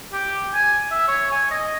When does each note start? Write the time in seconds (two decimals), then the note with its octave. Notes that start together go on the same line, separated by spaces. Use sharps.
0.13 G4
0.54 G#5
0.92 E5
1.08 C#5
1.32 G#5
1.51 D#5